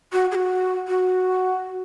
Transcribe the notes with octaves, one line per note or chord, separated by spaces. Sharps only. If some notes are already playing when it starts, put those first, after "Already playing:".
F#4
G#4
F#4
F#4